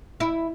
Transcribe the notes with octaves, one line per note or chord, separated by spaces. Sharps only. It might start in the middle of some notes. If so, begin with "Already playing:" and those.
E4